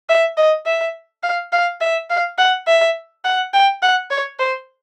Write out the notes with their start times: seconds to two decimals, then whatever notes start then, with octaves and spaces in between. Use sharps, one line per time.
0.09 E5
0.37 D#5
0.66 E5
1.23 F5
1.53 F5
1.81 E5
2.10 F5
2.38 F#5
2.67 E5
3.24 F#5
3.54 G5
3.82 F#5
4.11 C#5
4.39 C5